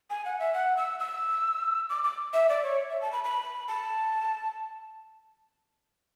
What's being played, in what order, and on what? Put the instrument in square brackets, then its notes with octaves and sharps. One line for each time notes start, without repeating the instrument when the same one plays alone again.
[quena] G#5
F#5
E5
F#5
E6
E6
D6
D6
E5
D5
C#5
E5
A5
B5
B5
A5